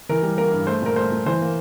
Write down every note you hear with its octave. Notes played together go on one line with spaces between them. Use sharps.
E3 A#4
G3
A#3 A#4
G2
A3 C5
A#2 A#4
A3 C5
A#2
E3 C5
A#3